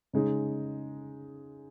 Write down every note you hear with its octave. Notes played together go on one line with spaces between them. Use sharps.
C#3 G#3 D#4